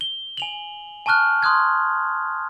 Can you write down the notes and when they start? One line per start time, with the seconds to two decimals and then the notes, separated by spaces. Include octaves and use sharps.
0.01 G7
0.37 G#5 F7 F#7
1.06 G#5 A5 C#6 F6 F#6
1.43 C6 D#6 F#6 G#6